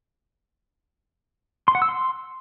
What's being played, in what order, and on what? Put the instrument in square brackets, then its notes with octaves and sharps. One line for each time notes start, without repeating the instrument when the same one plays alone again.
[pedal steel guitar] C6
F#5
E6
C6